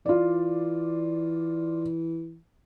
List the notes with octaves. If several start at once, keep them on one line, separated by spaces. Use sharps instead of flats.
E3 F4 D5